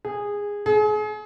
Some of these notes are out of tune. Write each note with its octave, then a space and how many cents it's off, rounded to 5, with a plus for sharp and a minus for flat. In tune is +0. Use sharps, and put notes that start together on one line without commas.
G#4 -15
G#4 +35